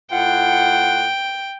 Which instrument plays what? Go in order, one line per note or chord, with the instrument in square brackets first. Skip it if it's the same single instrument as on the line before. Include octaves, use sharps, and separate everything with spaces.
[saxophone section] A2 F4 F#5 [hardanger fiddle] G5